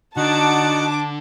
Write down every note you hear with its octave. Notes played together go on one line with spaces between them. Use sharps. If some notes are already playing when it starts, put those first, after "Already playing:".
D3 D4 D#4 F#4 F#5 A5 D6